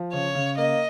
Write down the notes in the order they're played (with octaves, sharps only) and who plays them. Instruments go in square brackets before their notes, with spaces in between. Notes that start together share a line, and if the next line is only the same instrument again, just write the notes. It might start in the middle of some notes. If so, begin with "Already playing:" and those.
Already playing: [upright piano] F3
[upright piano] C#3 [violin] C#5
[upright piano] C#3
[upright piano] A#3 [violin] D#5